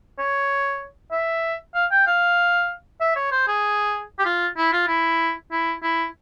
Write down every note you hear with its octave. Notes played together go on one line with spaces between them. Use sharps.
C#5
E5
F5
G5
F5
E5
C#5
C5
G#4
G4
F4
E4
F4
E4
E4
E4